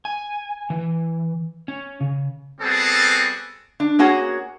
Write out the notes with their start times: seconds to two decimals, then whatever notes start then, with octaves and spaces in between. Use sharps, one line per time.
0.05 G#5
0.70 E3
1.68 C#4
2.01 C#3
2.60 G3 B3 C4 F#4 G#4 A4
3.80 D4
3.99 A#3 C#4 F#4 G#4